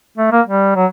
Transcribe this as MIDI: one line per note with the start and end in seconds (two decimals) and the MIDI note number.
0.18 0.30 57
0.32 0.41 58
0.47 0.72 55
0.76 0.86 54